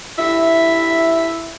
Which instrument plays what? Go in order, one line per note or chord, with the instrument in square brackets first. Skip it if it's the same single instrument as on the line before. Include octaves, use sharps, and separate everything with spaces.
[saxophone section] G2 A4 E5 [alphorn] E4